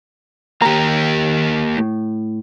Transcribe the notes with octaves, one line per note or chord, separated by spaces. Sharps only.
D#2 A#3 G4 A#5
A2